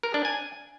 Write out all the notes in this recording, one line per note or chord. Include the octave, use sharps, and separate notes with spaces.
A#4
D4
G#5